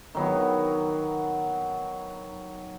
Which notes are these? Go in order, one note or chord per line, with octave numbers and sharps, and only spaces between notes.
D#3 F#3 B3